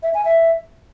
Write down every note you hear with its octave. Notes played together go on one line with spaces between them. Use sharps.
E5
G#5
E5